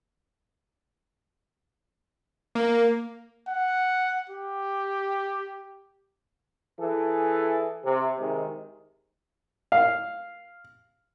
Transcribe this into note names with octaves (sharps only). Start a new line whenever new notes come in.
A#3
F#5
G4
E3 G#4 A4
C3
C3 D#3 G#3
F5